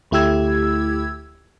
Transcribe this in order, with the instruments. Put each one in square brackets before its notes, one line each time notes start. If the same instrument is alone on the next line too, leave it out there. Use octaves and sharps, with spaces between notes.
[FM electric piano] D2 A3 E4 G4 E6 G#6